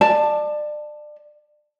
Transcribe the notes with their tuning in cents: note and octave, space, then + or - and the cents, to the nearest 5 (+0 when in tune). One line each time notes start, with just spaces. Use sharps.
D5 +30 A5 +5